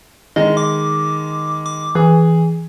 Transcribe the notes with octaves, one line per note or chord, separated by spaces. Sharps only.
D#3 G#3 D#5
D6
D6
E3 G#4